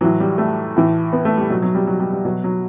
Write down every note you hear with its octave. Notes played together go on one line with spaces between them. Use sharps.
A2 E3 F#3
G3
A3
A2 E3
B3
A3
G3
B2 F#3
F#3
G3
F#3
G3
G3
B2 F#3
F#3